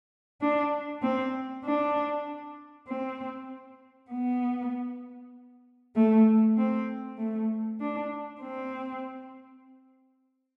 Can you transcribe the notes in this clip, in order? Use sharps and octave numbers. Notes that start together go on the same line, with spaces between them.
D4
C4
D4
C4
B3
A3
C4
A3
D4
C4